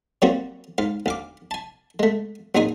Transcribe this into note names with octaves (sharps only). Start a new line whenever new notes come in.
F#3 G3 A#3 C4 C#4 F#4
G#2 F5
D2 F5 D6
G#5 A5
G#3 A3
A1 F#2 A#2 D#4 G#4 G#5